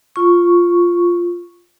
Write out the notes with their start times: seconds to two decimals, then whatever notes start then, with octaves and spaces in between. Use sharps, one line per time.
0.16 F4 C#6